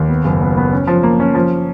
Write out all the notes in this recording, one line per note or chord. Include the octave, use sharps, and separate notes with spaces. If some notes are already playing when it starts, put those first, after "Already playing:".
Already playing: D#2
B3
F#1
B3
B3
C#4
F3
A#3
C#4
F3